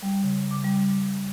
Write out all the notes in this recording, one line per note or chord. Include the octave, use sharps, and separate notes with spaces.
G3
C#3
D6
G3